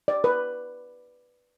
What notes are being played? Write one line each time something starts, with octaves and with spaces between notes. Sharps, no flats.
D5
B4